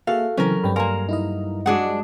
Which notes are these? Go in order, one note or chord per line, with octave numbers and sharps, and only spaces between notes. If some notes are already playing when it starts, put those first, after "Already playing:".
A#3 F#4 G#4 A4 E5 F5
C#3 E3 F#3 C4 C#4 A#4
G2 C4 G5 B5
A#3 A#4 F5 G#5 C6
D#4 E4 D#5
G#3 D4 F#4 G#4 F#5